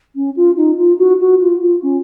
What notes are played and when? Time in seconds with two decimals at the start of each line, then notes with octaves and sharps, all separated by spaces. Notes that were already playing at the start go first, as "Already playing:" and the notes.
0.15 C#4
0.36 F4
0.56 D#4
0.78 F4
0.98 F#4
1.19 F#4
1.40 F4
1.61 F4
1.82 C#4